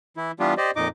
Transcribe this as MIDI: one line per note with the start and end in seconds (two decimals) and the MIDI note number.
0.17 0.32 52
0.17 0.32 64
0.40 0.54 52
0.40 0.54 55
0.40 0.54 59
0.40 0.54 62
0.40 0.54 65
0.40 0.54 67
0.57 0.71 67
0.57 0.71 72
0.57 0.71 74
0.57 0.71 75
0.76 0.88 41
0.76 0.88 46
0.76 0.88 63
0.76 0.88 75
0.76 0.88 86